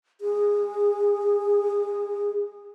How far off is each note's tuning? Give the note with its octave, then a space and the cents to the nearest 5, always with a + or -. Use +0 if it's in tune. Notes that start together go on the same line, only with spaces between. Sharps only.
G#4 -20